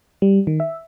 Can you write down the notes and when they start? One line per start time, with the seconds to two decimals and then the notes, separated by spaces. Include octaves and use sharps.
0.22 G3
0.47 D#3
0.60 E5